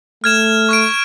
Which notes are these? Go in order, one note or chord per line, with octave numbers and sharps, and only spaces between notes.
A3 F6 G#6 E7
C#6 F6 D7